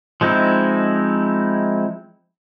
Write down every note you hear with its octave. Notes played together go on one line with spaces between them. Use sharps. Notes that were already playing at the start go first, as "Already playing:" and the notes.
F3 G#3 C4 D#4 E4